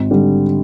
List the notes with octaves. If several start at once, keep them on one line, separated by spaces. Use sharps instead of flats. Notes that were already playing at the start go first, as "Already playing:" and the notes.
Already playing: G#1
D3 G3